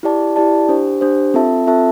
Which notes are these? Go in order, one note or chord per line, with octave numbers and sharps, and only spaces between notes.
E4 G4 D5 A5
E4 G4 D5 A5
D4 G4 C5
D4 G4 C5
C4 F4 A4 E5 A5
C4 F4 A4 E5 A5